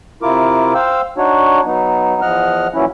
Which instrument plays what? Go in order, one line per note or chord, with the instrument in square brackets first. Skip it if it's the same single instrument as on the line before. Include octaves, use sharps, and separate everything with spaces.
[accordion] C3 E4 F4 A#4 D6
C5 F5 G5 E6
D4 D#4 F#4 C#5
F#3 B3 D#4
E2 F3 D#5 F#5 F6
A#2 E3 F#3 C#4 E4